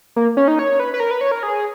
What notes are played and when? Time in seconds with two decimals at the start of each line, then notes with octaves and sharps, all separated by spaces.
0.16 A#3
0.37 C#4
0.48 D#4
0.59 C#5
0.80 B4
0.94 B4
1.00 A#4
1.11 B4
1.21 C#5
1.31 A#4
1.43 G#4